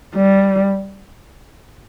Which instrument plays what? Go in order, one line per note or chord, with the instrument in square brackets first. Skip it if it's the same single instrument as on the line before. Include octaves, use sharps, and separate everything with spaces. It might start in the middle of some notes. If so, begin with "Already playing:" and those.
[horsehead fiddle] G3